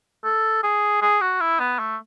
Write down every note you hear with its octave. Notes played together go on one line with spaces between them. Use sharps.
A4
G#4
G#4
F#4
E4
B3
A3